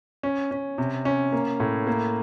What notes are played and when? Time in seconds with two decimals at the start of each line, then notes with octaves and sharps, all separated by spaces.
0.23 C#4
0.51 C#4
0.78 C3
1.05 C#4
1.33 A#3
1.60 A2
1.87 A#3